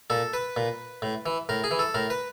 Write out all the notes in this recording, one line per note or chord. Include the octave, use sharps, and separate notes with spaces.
A#2 A4
B4
A#2
A2
E3
A2 A#4
G#4
E3
A4
A2 A#4
B4